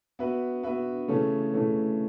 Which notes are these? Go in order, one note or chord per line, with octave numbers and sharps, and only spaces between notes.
B3 F#4 B4 E5
B3 F#4 B4 E5
C#3 E3 A3 C#4 A4
C#3 E3 A3 C#4 A4